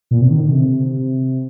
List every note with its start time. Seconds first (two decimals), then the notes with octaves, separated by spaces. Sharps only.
0.11 A#2
0.21 C3
0.31 D#3
0.41 D3
0.52 C3